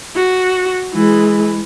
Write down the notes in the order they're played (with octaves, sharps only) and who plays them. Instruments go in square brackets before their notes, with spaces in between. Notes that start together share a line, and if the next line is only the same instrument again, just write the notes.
[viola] F#4
[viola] E3 [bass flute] G#3